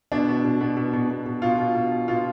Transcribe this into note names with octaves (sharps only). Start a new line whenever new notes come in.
B2 D4
B2
B2
B2
B2
B2
B2
B2
B2 F4
B2
B2
B2
B2 F4